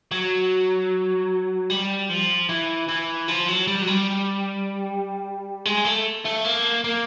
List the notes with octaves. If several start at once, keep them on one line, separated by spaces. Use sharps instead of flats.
F#3
G3
F3
E3
E3
F3
F#3
G3
F#3
G3
G#3
A3
A3
A#3
A#3